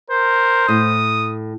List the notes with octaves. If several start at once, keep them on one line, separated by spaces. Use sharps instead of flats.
A#4 C5
A2 D#6